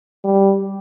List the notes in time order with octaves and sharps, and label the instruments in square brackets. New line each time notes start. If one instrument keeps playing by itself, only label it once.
[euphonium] G3